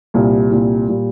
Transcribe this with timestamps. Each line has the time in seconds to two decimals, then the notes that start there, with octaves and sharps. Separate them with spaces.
0.14 C2 A#2 G3
0.51 C2 A#2 G3
0.88 A#2 G3